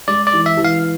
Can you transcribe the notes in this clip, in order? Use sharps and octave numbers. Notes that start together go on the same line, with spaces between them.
G#3 D5
D5
E3
E5
E3
F5